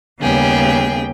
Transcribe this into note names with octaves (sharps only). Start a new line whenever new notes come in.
D#2 C#3 G3 B3 G#4 G5